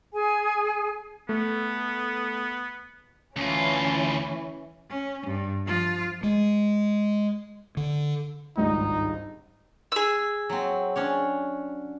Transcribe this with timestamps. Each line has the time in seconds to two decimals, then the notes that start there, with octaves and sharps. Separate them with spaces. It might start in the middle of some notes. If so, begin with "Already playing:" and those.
0.13 G#4 G#5
1.29 A3 B3
3.37 D2 E3 C#4 F4
4.90 C#4
5.26 G2
5.65 F3 F4
6.23 G#3
7.77 D3
8.57 G#1 C#2 G2 D#4
9.92 G#4 E6
10.49 F#3 C4
10.96 C#4 D4 C#5